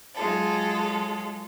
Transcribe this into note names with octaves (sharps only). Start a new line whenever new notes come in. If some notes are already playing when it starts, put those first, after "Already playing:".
F#3 G#3 F4 A4